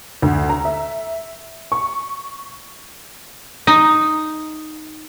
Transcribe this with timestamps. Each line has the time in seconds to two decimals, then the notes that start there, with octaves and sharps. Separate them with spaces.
0.22 D2
0.50 A#5
0.65 E5
1.72 C#6
3.67 D#4